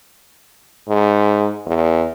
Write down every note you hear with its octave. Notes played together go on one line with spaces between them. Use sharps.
G#2
E2